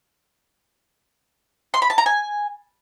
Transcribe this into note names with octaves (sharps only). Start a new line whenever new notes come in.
C6
B5
A5
A#5
G#5